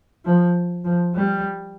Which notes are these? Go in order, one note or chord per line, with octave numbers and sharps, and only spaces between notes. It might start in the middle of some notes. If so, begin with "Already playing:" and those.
F3
F3
G3